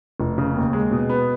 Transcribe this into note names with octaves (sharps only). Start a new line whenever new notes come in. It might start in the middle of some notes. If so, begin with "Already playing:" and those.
F1
C#3
D#2
G#3
B2
B3